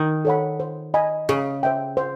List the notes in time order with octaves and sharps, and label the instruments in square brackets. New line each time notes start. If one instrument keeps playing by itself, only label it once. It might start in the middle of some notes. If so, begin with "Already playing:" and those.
Already playing: [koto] D#3
[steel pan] A4 C#5 F#5 B5
C5
D#5 G#5 B5
[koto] C#3 [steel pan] G#4
[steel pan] C5 E5 G5
C5